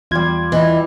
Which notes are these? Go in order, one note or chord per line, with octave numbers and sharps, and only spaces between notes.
E2 G3 F4 G#6
E3 D#5